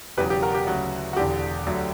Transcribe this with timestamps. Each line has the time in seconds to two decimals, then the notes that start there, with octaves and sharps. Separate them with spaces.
0.17 E1 E2 C#3 F#3 G4 B4
0.30 G4
0.42 F#4 A#4
0.55 G4
0.67 D2 C#3 F#3 F#4
1.13 F#4
1.17 E1 E2 D3 G4
1.66 D2 D3 F#3